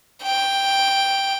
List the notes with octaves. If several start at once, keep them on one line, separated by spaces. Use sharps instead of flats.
G5